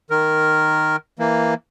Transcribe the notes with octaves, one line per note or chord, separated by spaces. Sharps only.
D#3 A#4
E3 A#3